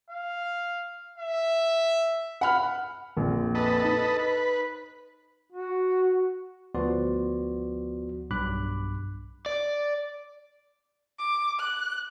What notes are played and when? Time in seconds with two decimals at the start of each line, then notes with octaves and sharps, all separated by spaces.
0.10 F5
1.18 E5
2.41 F#5 B5 F6
3.17 A#1 F2
3.55 A4 B4 D#5
3.84 D#4
4.19 B4
5.53 F#4
6.75 D2 F3 B3 F#4 D5 C6
8.31 B1 G2 B5 D6 F#6
9.46 D5
11.19 D6
11.60 F#6